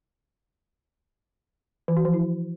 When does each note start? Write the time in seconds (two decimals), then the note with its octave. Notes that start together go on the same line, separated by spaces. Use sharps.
1.88 E3
1.97 F#4
2.05 F3
2.13 E4